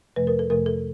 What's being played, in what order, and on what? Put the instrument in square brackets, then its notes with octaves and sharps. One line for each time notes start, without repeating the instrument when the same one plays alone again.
[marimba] F2 C3 F3 A3 B4
A#4
A4
F2 C3 F3 A3 A#4
A4